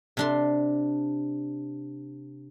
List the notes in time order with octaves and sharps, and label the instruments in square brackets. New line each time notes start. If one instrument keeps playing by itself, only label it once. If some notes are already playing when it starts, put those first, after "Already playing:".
[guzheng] C3 D4 C6